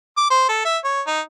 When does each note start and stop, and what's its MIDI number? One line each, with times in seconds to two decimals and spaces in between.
0.17 0.25 86
0.30 0.44 72
0.49 0.61 69
0.65 0.78 76
0.84 1.02 73
1.07 1.20 63